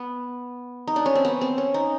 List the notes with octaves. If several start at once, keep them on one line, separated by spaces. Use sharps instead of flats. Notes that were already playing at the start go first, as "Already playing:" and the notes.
Already playing: B3
D#4
D4
C#4
C4
B3
C4
C#4
D#4